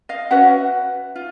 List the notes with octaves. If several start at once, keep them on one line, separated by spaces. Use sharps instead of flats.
D#5 F5
C#4 F#4 B4 E5 F#5
F4